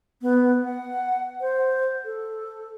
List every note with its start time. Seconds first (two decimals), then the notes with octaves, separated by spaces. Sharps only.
0.22 B3
0.64 F#5
1.41 C5
2.05 A4